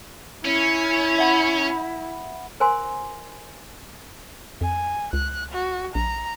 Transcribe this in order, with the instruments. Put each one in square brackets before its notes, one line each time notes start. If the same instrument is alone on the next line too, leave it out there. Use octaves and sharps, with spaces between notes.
[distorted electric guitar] C#4 [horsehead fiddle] E4
[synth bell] E5 F#5 B5
[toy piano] A#4 C5 G#5 C6
[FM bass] F2 [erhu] G#5
[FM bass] C#2 [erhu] F#6
[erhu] F#4
[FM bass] A#1 [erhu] A#5